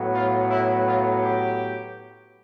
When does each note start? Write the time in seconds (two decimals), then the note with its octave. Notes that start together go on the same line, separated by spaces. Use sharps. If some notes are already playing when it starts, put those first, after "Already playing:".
Already playing: A2 F#3 B3
0.14 F4
0.50 E4
0.86 F4
1.22 G4